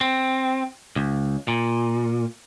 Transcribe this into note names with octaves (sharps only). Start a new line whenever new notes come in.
C4
C#2
A#2